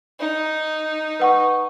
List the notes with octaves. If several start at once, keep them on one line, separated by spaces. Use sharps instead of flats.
D#4
B4 F#5 C#6